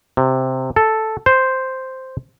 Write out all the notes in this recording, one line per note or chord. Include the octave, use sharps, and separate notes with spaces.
C3
A4
C5